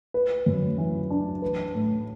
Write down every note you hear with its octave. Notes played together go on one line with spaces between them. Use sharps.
B4
F#2
E3
D4
B4
A2